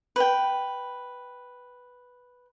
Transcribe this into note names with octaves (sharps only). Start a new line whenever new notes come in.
B4 G5